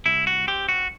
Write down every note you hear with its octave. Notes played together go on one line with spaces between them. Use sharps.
C2 E4
F#4
C4 G4
F#4